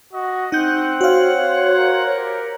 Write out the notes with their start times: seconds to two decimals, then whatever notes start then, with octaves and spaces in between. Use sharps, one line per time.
0.13 F#4 D#5
0.52 C4 D#4 F#5 G6
1.01 F#4 C5 C#5 F5
1.78 A#4
2.18 G4